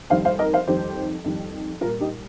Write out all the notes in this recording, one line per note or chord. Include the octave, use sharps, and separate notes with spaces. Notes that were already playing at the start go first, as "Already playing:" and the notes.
F2 D#3 G3 C5 F5
C5 F5
A#4 D#5
C5 F5
F2 D#3 G3 G4 C5
F2 D#3 G3
A#2 G3 F4 A#4
D#4 G4